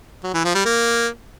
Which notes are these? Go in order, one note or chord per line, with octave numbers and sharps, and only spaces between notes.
F#3
E3
F3
G3
A#3